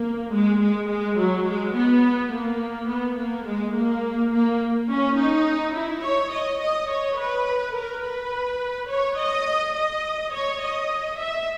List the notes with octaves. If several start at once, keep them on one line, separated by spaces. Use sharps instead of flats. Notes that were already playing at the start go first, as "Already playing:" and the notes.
Already playing: A#3
G#3
G#3
G#3
F#3
G#3
B3
A#3
B3
A#3
G#3
A#3
A#3
C#4
D#4
E4
C#5
D#5
D#5
C#5
B4
A#4
B4
C#5
D#5
D#5
C#5
D#5
E5